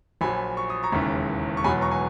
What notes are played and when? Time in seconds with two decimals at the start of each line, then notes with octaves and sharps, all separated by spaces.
0.21 A#1 A#2 F#3 G#5 B5
0.57 C#6
0.70 D#6
0.83 A#5 C#6
0.92 E1 D#2 C#3 E3
1.57 C#6
1.64 E1 E2 B2 F#3 G#5 B5
1.81 A#5 C#6
1.91 G#5